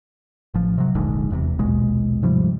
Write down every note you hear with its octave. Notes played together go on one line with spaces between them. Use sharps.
A1 F3
C3 F#3
D#1 A#1 G#2 D3
E1 E2 A2 C3
A#1 D#2 B2 G#3
G#2 C3 F3 G3